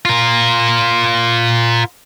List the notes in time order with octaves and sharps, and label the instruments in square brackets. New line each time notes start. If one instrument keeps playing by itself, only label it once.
[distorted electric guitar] F4 A#4